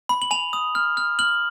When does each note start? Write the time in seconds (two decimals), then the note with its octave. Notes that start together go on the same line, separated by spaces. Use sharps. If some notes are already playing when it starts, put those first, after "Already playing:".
0.09 B5
0.22 F#7
0.31 G#5 F7
0.53 D#6
0.75 F6
0.97 F6
1.19 F6 F#7